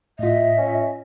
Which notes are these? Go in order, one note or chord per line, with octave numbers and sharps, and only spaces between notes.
A2 F4 D#5 E5
C#4